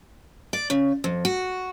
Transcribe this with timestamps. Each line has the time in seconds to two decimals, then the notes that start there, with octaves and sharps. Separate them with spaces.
0.53 D5
0.70 C#3
1.04 F2
1.25 F#4